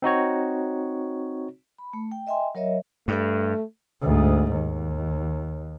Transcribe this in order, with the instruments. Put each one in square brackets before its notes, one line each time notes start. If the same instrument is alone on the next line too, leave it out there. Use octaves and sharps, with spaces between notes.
[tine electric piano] C4 D#4 F#4 C#5
[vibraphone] B5
A3
G5
D#5 E5 G5 G#5 C6
F#3 A#4 C#5 D#5 E5
[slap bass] G2 [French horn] A3
[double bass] D2 G#2
D#2